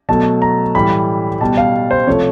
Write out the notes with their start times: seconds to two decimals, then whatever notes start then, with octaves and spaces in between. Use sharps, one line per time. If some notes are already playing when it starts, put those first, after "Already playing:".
0.09 B2 F#3 A3 A5
0.42 A#5
0.75 A2 E3 G3 B5
1.41 B2 G3 A5
1.57 F5
1.91 C5
2.07 C3 F3 A3 C#5